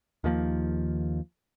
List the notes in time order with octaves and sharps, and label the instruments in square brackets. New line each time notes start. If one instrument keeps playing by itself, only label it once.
[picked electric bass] D#2 D#3 F3 A#3